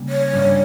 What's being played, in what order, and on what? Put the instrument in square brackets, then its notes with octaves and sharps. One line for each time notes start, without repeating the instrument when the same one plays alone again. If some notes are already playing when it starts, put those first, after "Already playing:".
Already playing: [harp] C#3 G3 A#3
[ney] C#5
[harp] G1 G2 G3 C#4